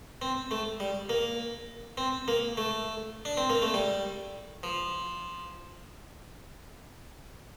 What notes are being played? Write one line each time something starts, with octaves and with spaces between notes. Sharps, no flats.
C4
A3
G3
A#3
C4
A#3
A3
D4
C4
A#3
A3
G3
F3